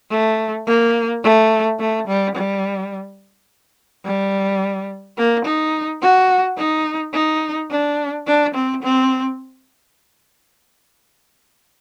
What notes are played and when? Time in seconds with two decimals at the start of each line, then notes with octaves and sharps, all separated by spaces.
0.11 A3
0.67 A#3
1.23 A3
1.80 A3
2.08 G3
2.36 G3
4.05 G3
5.18 A#3
5.45 D#4
6.02 F#4
6.58 D#4
7.14 D#4
7.70 D4
8.27 D4
8.54 C4
8.83 C4